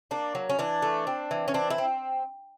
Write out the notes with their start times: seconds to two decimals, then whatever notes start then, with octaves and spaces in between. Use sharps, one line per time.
0.11 A#3 D4
0.35 F#3
0.49 C#4
0.59 E3 D4
0.82 A3
1.07 C4
1.31 E3
1.48 C#4
1.54 C4 D4
1.70 E4
1.78 C4